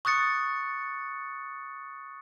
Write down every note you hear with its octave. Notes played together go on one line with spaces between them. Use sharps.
C#6 D#6 F#6 A6 C#7